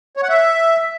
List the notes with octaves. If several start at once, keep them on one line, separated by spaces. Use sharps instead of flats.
C#5
F#5
E5